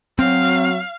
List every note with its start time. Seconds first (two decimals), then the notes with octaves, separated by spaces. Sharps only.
0.19 F#3 C4 F5